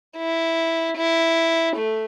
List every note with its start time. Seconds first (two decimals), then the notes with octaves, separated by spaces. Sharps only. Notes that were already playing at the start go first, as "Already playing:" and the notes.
0.18 E4
0.97 E4
1.76 A3